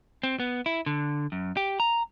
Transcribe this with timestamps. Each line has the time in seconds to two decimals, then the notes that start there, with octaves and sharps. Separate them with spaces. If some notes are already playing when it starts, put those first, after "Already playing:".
0.23 C4
0.40 B3
0.66 E4
0.86 D3
1.32 F#2
1.57 G4
1.80 A#5